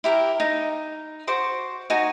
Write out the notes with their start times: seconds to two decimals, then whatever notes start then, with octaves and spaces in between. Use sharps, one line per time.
0.04 E4 G4 A#4
0.40 D#4
1.27 F#4 C5 D6
1.90 D#4 F#4 G#5